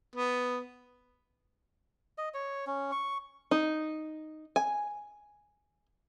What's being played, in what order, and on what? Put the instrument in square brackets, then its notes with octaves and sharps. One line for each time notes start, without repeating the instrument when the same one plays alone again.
[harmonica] B3
[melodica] D#5
C#5
C#4
C#6
[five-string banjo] D#4
G#5